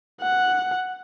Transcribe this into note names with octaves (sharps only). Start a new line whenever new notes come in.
F#5